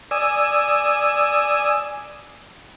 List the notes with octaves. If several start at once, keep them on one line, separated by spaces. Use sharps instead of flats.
D5 G#5 D#6 E6